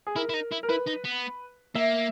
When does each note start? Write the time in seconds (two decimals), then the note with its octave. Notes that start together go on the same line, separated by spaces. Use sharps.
0.07 G#4
0.16 E4 A#4
0.29 E4
0.34 D#4
0.52 E4
0.63 A#4
0.69 E4 B4
0.86 D#4
1.04 B3
1.75 A#3 E5